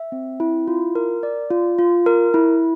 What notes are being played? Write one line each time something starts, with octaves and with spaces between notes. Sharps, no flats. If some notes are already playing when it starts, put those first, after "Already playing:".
Already playing: E5
C4
E4
F4
A#4
D5
F4
F4
A#4
E4